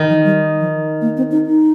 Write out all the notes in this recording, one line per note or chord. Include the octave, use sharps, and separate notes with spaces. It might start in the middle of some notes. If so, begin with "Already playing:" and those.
Already playing: D#3
F3
G3
F3
A#3
C4
D#4
D#4